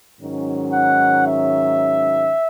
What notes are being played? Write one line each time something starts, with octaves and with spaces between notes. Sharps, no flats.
G#2 D#3 F#3 C#4
F#5
E5